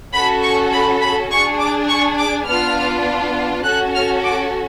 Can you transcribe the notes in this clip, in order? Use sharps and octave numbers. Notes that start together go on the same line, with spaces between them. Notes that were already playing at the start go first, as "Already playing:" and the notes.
C#4 F#4 A4 B5
C#6
B5
B5
D4 G#4 C#6
D6
C#6
D6
B3 D4 F4 F6
C#4 F#4 A4 F#6
F6
D6